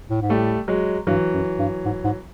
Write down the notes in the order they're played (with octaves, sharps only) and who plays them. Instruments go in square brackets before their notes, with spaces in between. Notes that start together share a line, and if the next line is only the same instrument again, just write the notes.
[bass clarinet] A2
G#2
[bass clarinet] A2 [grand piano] G3 A3
[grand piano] F#3 G#3
[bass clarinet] G2 [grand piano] E3 F#3
[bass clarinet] F#2
G2
G#2
G#2